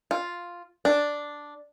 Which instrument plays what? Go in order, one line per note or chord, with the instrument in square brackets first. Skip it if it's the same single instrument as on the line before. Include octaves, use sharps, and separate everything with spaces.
[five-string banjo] F4
D4